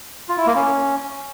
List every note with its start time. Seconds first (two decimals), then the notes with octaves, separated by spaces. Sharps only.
0.29 F4
0.38 E4
0.46 A#3
0.55 C#4